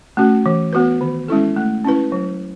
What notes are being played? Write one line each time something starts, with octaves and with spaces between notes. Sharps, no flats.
A3 C#4 F#4
E3
B3 F#4 B4
D#3
G#3 C#4 E4 A4
A3
C#4 E4 B4
F#3